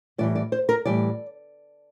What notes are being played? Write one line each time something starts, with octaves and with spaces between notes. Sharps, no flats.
A2 E3 G3 D5
D5
C5
A#4
A2 E3 G3 D5